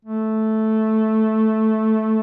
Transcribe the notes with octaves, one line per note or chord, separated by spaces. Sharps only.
A3